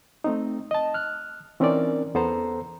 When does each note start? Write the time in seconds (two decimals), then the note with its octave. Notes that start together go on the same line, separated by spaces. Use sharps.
0.24 A3 C4 D#4
0.71 D#5 A5
0.94 F6 F#6
1.60 E3 C4 C#4 D#4 A#4 D5
2.14 E2 B3 A4 C5 A#5